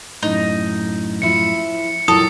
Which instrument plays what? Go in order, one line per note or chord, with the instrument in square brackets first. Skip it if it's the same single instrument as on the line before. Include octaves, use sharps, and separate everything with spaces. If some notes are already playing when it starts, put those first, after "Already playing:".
[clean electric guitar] F#2 A2 [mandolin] D#4
[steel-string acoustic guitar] F3 E4 [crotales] C#7
[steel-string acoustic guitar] A#2 F#3 [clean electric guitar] E4 G5 A5 [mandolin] A4 [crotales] D#6